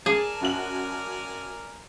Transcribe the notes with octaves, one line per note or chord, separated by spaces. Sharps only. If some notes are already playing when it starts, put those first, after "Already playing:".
G#4 A#4 D5 G#5 A5
F#2 F#4 F#7